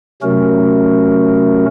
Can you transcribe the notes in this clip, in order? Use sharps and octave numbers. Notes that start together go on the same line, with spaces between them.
C3 F#3 A3 C#4 F#4 A#4